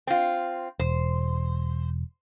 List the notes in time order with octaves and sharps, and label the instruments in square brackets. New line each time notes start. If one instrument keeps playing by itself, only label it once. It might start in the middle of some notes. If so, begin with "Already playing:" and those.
[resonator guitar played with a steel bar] C4 F4
[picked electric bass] E1 [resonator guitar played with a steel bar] C5